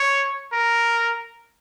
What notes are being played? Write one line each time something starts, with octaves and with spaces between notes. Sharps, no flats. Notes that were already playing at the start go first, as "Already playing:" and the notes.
Already playing: C#5
A#4